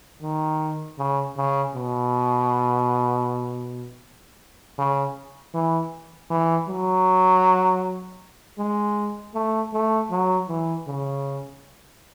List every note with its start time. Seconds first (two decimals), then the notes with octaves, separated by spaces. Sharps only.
0.22 D#3
0.98 C#3
1.36 C#3
1.75 B2
4.78 C#3
5.54 E3
6.30 E3
6.68 F#3
8.58 G#3
9.35 A3
9.73 A3
10.11 F#3
10.48 E3
10.87 C#3